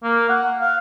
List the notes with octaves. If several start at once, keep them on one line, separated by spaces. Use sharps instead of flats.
A#3
F#5
F5